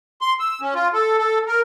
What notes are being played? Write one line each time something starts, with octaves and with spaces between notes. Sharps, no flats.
C6
E6
C#4
F4
A4
A4
A#4